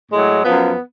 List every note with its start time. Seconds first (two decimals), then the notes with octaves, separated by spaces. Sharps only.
0.11 A2 F#3 G#3
0.44 F#2 F3 B3